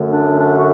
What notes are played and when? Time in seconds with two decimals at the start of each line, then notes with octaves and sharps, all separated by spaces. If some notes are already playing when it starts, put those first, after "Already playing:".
Already playing: F#2 D3 A3
0.09 D4
0.40 D4
0.55 F#4